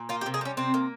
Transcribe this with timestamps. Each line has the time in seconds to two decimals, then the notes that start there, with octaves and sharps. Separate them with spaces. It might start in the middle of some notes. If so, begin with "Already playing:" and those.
Already playing: A#2
0.09 A#3 F4
0.21 G4
0.26 C3
0.34 G#4
0.41 G3 C#4
0.57 C3 C4
0.74 A#3